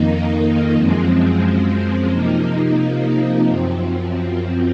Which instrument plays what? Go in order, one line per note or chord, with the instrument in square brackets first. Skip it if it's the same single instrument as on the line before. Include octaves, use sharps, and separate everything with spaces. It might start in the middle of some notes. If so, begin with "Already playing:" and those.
Already playing: [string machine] F2 D#3 A#3 D#4
F#2 F3 G#3 C4
C3 F3 A#3 D#4
F#2 F3 C4